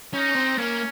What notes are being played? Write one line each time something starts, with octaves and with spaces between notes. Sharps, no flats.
C#4 D#4
C4
A#3 C#4